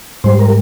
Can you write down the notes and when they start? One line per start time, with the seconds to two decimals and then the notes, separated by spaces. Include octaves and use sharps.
0.24 G#2 G3 C5
0.39 A#4